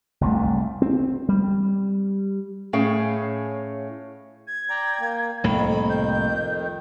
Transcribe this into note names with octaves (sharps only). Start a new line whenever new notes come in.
F#1 C2 A3
C4
G3
A2 C#4 G#4 F5 G5
G#6
D5 G5 A#5
A#3
C2 F2 A2 D#3 A#3 B5
G6